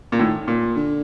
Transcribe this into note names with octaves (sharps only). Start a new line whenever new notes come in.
A#2
A2 D#3
A#2
D3